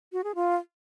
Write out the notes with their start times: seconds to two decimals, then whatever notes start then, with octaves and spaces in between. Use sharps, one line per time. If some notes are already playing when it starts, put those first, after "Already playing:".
0.13 F#4
0.24 G#4
0.35 F4